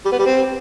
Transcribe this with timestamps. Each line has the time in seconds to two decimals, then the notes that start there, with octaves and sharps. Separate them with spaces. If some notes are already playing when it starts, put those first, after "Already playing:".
0.05 G3
0.12 B3
0.19 G3
0.26 C4